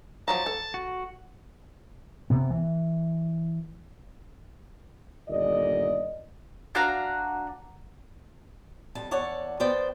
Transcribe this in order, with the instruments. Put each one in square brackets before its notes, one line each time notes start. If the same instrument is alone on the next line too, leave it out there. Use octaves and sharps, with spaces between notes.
[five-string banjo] F3 F#3 A#5 [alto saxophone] A5
[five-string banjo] A4
[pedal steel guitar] F#4
[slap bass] C3 B3
E3
[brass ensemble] G1 D#2 A#2 D5 D#5
[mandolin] D4 F#4 F5 A#5
[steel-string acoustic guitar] F2 G3 A5
E2 C#5 D5 F#5 A5
F3 B3 C5 D5 G5